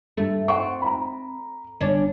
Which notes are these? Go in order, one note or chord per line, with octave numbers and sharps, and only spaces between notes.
G2 A3
C4 F#5 C#6
A#5 B5
G1 C#4 D4